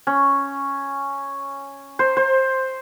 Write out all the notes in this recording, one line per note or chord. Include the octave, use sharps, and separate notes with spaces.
C#4
C5
C5